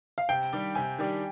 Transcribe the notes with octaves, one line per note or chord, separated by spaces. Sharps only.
F5
C3 G5
D#3 G3 D4 G4
C3 G#5
D#3 G3 D4 G4